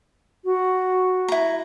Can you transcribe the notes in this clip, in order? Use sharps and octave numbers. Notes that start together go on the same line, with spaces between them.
F#4
E4 A#5